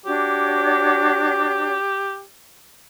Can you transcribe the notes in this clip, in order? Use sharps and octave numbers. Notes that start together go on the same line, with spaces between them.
D4 F#4 G4 C#5